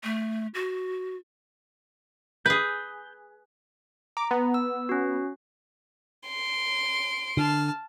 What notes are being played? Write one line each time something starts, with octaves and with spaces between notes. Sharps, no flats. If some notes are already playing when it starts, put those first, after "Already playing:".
A3
F#4
G#4 B4 G6
A#5 D6
B3
E6
C#4 F#4
C6 D7
D3 A5 F6